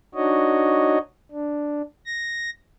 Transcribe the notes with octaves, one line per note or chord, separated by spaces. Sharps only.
D4 D#4 F#4 C#5 D#5
D4
A#6